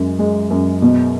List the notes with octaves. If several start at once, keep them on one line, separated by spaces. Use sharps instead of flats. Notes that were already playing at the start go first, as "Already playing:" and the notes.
Already playing: F#2 G#3
G#3
F#2
B2